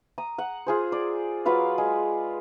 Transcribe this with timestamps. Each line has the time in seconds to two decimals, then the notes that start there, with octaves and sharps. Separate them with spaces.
0.18 A#5 D#6
0.38 F#5
0.67 F4 G#4 C5
0.92 D5
1.45 F#3 F4 B4 F5
1.78 G#3